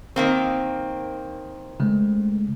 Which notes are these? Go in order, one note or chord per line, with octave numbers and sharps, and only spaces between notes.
D#3 A#3 C4
C#3 G#3 A3